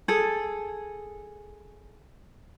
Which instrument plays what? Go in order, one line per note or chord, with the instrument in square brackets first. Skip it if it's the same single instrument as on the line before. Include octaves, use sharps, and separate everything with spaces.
[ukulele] G#4 A4